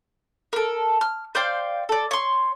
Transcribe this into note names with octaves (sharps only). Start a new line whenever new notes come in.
A4 A#4
F6
C5 D5 F5 G5
A4 D5
C#5 C6